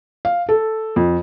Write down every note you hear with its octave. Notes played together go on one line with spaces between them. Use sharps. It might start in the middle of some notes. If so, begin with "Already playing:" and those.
F5
A4
F2